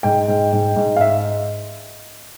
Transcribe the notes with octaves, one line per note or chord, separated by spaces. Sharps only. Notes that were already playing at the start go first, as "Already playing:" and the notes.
G#2 G5
G#2
G#2
G#2
F5
E5